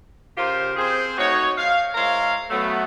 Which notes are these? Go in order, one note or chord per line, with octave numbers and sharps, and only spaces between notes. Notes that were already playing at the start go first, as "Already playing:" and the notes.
C#3 F4 G4 A#4 C5
C4 G#4 C5
A3 D#4 F#4 C#5
F5
G#3 E4 A#4 C5 C#5 F5
F#3 A3 B3